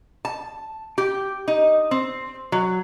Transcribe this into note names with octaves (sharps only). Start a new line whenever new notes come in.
A5
G4
D#4
C4
F#3